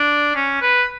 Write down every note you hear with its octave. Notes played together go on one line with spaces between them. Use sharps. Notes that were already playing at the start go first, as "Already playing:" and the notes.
Already playing: D4
C#4
B4